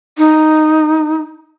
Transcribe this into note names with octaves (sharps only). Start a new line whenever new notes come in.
D#4